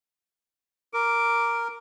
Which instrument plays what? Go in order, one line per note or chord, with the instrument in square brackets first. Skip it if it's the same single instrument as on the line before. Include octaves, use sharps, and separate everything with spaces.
[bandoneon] A#4 [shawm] D6